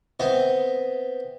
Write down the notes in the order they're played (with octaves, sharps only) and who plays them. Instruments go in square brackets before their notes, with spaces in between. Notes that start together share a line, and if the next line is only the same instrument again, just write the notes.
[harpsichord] B3 C4 D#5 E5